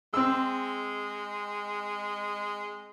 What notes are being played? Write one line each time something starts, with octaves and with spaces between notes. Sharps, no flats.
G#3 C4 E6